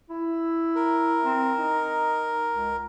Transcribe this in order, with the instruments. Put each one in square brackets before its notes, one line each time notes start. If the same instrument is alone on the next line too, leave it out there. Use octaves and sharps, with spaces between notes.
[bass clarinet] E4
[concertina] A#4
[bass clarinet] C4
D#4
C#2